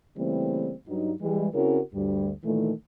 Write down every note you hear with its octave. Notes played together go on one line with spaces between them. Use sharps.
C#3 E3 G3 A3 A#3 C4
G2 F#3 D#4
E3 G3 G#3
C#3 C4 C#4 E4 F#4 A#4
D2 G2 G3
A#2 D#3 E3 A3